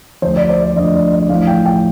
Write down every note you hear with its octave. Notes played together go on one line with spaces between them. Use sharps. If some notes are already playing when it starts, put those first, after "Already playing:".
D2 D3 F3 C5
D5
C5
D5
D2 D3 F3 D#5
D5
D5
A1 A2 F3 F5
G5
G5